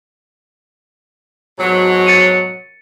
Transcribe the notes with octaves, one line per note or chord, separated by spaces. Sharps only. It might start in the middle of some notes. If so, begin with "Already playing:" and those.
G#2 B2 F#3
A6 C#7 D#7